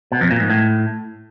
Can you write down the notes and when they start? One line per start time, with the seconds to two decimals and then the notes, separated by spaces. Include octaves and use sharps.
0.12 B2
0.21 F2
0.31 A#2
0.40 G#2
0.50 A2